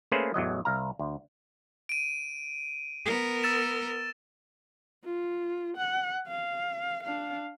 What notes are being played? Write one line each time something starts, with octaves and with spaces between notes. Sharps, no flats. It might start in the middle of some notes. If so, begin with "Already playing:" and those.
A3 A#3 C#4 G#4 B4 C5
A1 E2 F#3 D#5
C2 F5 A#5
D2
D7 D#7
B3 A#4
E6 A6 E7
F4
F#5
F5
D4 F5